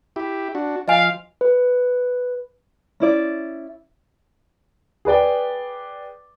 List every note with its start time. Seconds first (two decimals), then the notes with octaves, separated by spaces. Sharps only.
0.16 E4 G4
0.55 D4 F#4
0.88 F3 D#5 F5 G#5
1.41 B4
3.00 C#4 E4 D5
5.05 G#4 B4 D5 G5